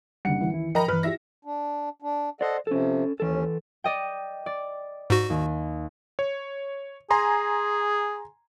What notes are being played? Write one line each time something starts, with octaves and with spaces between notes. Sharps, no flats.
F#1 D3 G3 F#5 C#7
D#2 E3
E4
F3 A#4 D#5 G5 A#5 B5
G2 E3 B4 F6
E4 F4 G4 E5 A#6
D4
D4
A4 C5 D5 D#5 F#5
C3 F3 C#4 A4
D#2 E3 C#4 A4
D5 D#5 G5
D5
G#2 F#4
D#2
C#5
G#4 G#5 A#5 C6